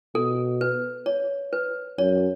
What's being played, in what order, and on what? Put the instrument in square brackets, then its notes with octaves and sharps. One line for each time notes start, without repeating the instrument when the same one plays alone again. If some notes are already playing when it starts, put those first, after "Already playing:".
[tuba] B2 [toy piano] A4
[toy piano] B4
C#5
B4
[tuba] F#2 [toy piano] C#5